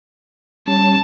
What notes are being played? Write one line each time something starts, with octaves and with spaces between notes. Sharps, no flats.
G3 C#4 A5